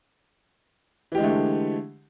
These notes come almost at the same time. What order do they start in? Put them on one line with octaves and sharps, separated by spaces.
E3 G4 G#3 D3 A3